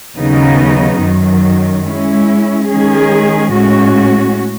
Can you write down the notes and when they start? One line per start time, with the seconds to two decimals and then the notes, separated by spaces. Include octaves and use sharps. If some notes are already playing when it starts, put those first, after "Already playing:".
0.17 D#2 C#3 F#3 B3 D#4
1.01 F#2 D#3 F#3
1.86 G#3 C#4 E4
2.69 D#3 G#3 C#4 G#4
3.53 A2 G#3 C#4 F#4